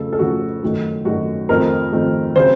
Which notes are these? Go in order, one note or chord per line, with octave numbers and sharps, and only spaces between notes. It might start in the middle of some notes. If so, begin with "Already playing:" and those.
Already playing: F2 C#3 A3 A4
A4
F2 C#3 A3 F#4
F#2 D#3 A3
F#2 D#3 A3 F#4
F2 D#3 A3 C4 A#4
F2 D#3 A3 C4
C#3 F#3 C4 C5